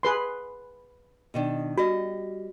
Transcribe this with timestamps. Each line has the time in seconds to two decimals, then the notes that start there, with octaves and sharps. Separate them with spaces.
0.03 G#4 B4 C6
1.34 B2 D#3 D4
1.78 G3 F#4 D#5